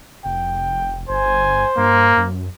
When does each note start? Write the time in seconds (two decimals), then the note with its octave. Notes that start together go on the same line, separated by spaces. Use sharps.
0.25 F1 G5
1.09 G1 C5 G#5
1.77 G2 A#3
2.17 F#2